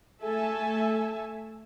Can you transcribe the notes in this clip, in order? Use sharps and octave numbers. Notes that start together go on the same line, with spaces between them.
A3 A4 E5 G#5 A5